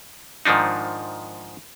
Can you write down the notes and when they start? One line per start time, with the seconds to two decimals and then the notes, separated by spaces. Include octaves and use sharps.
0.45 G#2 D#3 F3 D4 D#4